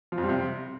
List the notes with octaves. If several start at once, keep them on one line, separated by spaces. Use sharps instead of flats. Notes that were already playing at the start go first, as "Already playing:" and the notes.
F3
F2
G3
C3